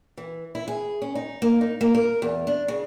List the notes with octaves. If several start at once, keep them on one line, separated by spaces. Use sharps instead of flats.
E3
E4
G#4
C#4
D#4
A#3
D#4
A#3
A#4
E2
D4
C#3